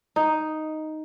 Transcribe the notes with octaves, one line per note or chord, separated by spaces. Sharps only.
D#4